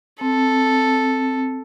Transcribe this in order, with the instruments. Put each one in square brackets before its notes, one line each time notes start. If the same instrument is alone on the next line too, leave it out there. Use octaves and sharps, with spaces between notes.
[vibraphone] C4 [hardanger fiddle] A4